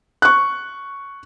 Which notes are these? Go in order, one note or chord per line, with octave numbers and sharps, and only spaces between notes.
C#6 F#6